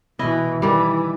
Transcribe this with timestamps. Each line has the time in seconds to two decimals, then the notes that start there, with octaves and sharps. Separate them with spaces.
0.19 B2 E3 E4 D#5
0.62 D#3 E3 G3